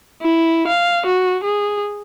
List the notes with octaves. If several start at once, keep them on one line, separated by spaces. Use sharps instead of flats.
E4
F5
F#4
G#4